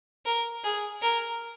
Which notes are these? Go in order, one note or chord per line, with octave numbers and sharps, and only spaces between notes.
A#4
G#4
A#4